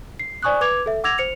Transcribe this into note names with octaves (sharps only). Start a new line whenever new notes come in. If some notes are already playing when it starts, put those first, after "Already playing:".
C7
C5 D5 G#5 C#6 D#6 F#6
B4 D6 G#6 F7
A4 E5
F#5 D6 E6 G#6 A#6 F7
C5 C#7 F7